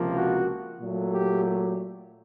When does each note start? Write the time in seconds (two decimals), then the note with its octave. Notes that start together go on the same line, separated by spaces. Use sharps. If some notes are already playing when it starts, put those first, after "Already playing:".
Already playing: C#2 C3 F3 A#3
0.16 F#4
0.80 A#2 F#3 A3
1.12 G4